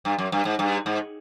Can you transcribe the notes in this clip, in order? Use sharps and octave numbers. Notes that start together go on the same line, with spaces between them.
G2
F#2
G2
G#2
G2
G#2